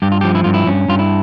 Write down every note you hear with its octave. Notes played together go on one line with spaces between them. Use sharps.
G2 G4
F4
F3 G4
E4
G2 F4
E4
G2 C#4
G2 F4
E4